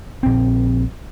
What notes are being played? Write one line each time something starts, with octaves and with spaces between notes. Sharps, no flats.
A#1 C4